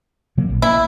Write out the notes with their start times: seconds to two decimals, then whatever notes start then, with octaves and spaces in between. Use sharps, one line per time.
0.38 C3 F#3 A#3
0.50 A#1
0.62 A#3 E4